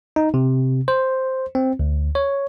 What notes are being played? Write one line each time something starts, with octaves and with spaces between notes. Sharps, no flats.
D#4
C3
C5
C4
D2
C#5